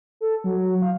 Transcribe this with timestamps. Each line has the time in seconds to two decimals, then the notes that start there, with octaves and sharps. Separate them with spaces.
0.21 A4
0.44 F#3
0.82 F5